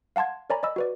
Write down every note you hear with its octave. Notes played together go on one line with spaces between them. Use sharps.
F5 F#5 A5 C6 G#6
A#4 C#5 D5 G#5 A#5 B5
D5 D#5 B5 E6
F#4 B4 D5